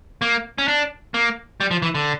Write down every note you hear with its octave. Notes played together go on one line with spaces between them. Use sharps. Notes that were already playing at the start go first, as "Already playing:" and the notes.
A#3
C#4
D4
A#3
G3
F3
E3
D3